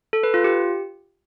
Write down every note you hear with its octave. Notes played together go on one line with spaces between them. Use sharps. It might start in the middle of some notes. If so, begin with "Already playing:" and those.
A4
B4
F4
G4